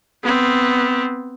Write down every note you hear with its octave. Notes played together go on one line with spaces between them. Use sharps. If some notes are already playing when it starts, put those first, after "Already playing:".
B3 C4